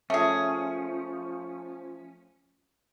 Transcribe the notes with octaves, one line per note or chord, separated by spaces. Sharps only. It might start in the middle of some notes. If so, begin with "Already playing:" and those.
F3 A3 C#4 G#4 E5